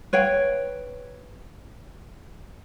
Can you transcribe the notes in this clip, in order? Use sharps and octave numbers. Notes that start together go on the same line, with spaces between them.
B4 C#5 F5 G5